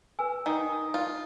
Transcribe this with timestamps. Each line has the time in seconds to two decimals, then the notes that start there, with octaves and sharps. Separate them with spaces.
0.19 B4 G#5 E6
0.46 D#3 D#4 D#6
0.94 F4